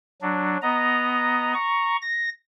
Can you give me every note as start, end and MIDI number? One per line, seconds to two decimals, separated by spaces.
0.22 0.57 54
0.22 0.57 62
0.62 1.54 59
0.62 1.54 75
0.62 1.54 82
1.54 1.96 82
1.54 1.96 85
2.02 2.29 94